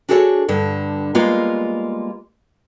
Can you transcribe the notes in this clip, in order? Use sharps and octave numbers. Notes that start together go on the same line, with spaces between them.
D4 F#4 G#4 A4 C5 C#5
G2 D3
G3 G#3 A#3 B3 F4